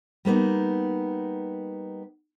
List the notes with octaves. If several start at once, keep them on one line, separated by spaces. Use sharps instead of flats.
G3 A#3 B3 D#4